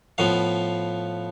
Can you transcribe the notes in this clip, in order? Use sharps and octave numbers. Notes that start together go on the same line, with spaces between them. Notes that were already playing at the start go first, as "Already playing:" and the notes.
A2 F3 B3 F5